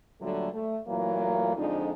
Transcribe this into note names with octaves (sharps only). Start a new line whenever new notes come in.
A#2 D3 F#3 G3 A3
A3
A#2 E3 F#3 A3 A#3
F2 D3 F3 G#3 D4 D#4